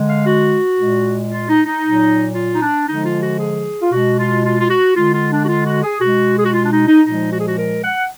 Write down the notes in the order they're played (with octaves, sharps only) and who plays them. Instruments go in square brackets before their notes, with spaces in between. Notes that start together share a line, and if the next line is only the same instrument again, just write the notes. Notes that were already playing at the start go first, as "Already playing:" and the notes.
Already playing: [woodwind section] D3 G#3
F5
F#4
A#2 G#3
F4
D#4
D#4
A#2 F#3
F4
D#4
D4
D3 F3 G#3 D#4
F4
F#4
G#4
F4
B2 G#3 F#4
F4
F4
F4
F#4
D3 G#3 F4
F4
D4
F#4
F4
F#4
G#4
B2 G#3 F#4
G#4
F#4
F4
D4
D#4
D#4
A#2 F3 G#3 D#4
F#4
G#4
F#4
A#4
F#5